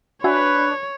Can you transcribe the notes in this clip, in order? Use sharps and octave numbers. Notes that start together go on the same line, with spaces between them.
D4 F#4 B4 C#5 E5 G#5